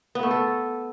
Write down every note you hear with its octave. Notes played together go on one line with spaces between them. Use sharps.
B3
A3
A4